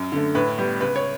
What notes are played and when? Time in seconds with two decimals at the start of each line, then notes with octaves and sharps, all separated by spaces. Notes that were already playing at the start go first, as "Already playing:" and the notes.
Already playing: F#2
0.12 D3 A3
0.35 A2 B4
0.58 G3 B3
0.80 C#2 B4
0.96 C#5